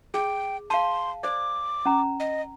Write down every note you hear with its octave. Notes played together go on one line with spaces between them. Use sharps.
G#4 G5
F5 A5 C6
C5 D5 D6
C#4 A#5
D#5